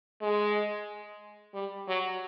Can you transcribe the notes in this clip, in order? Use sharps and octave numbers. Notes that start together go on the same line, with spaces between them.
G#3
G3
F#3